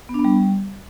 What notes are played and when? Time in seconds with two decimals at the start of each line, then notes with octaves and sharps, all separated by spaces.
0.09 B3
0.14 D4
0.19 B3
0.24 G3